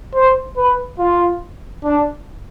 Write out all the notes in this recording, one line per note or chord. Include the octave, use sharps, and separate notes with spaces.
C5
B4
F4
D4